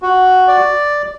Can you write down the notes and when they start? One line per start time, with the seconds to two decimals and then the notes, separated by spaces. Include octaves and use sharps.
0.02 F#4
0.48 D5